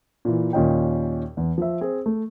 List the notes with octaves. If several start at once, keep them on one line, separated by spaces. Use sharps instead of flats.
A#2 E3
D#2 A#2 C#4 D#5 G5
E2
F3 E5
C4 G#4
A3